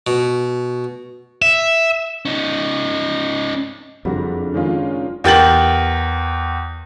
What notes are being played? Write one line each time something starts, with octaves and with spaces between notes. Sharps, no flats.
B2
E5
C#4 D#4
F#1 F2 G3 D4 F#4 A#6
D#3 G#3 C#4 F4
E2 G4 A#4 A6 F#7